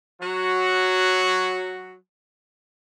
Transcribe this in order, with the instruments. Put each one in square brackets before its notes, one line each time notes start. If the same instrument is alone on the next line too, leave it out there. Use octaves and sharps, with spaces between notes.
[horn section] F#3 F#4